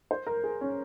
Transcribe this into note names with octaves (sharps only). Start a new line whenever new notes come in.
C5
A#4
G#4
C#4